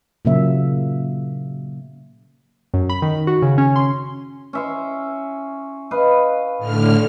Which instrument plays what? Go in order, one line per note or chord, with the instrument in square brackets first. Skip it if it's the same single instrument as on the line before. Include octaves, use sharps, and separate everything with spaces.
[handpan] A#2 C#3 F#3 A#3 C#4 E5
[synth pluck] F#2
B5
D#3
F#4
C#3
C#4
C6
[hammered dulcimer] C#4 E5 C6
B4 D#5 F5
[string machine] A2 D3 F6